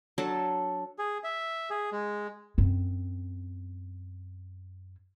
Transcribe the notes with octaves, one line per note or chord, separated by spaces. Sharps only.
F#3 D4 A4
G#4
E5
G#4
G#3
F#2 C4